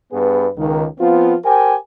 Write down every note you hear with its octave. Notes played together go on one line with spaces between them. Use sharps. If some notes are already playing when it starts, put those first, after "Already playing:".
G2 B3 G#4 B4
C#2 D#3
F3 B3 C4 F4
G4 A#4 C5 G5 G#5